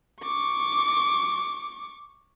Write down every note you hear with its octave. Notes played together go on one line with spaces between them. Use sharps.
C#6 D6